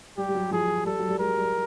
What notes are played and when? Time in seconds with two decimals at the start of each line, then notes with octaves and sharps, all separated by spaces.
0.17 G3 G4
0.29 G3
0.35 F#3
0.51 F3 G#4
0.85 G3 A4
0.99 F#3
1.09 G3
1.19 G#3 A#4
1.36 G3